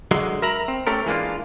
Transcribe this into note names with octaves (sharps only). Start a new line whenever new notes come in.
D3 F#3 G#3
A#4 E5 A#5 B5
C4
A3 C4 C#4 G4 A4 A#4
E3 G#3 A#3 D4 F4